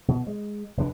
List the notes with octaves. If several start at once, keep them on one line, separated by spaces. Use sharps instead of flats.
B2
G#3
F1 D#2 D3 D4